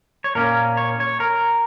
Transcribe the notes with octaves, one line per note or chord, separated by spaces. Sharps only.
C#5
A#2 A#3 C#4 A#4
C#5
C#5
A#4